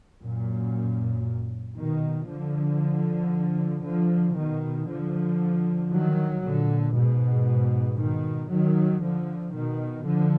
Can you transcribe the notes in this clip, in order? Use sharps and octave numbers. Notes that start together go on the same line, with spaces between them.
F#2 A#2
B2 D#3
D3 F3
D3 F3
B2 D#3
D3 F3
D#3 F#3
A#2 D3
G#2 B2
B2 D#3
D#3 F#3
D3 F3
B2 D#3
D3 F3